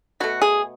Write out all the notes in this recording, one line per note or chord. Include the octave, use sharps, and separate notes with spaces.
B2 A3 F#4
G#4